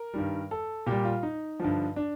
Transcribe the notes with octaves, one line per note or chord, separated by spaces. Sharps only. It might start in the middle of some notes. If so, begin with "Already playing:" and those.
Already playing: A#4
G2 D#3 G3
A4
A#2 G3 G4
F4
D#4
G2 D3 F3
D4